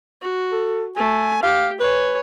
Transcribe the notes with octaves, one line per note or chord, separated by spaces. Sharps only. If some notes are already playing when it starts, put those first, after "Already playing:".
F#4
A4
A3 G#5
G4 F5
B4 C#5 G#5